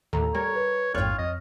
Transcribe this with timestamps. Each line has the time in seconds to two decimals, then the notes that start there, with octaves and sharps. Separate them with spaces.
0.13 D#2 A2 A4 A#5
0.35 G3 A#4 C#5
0.55 B4
0.95 A1 F2 G#2 F4 C#5 G5 F#6
1.19 F2 D#5 F6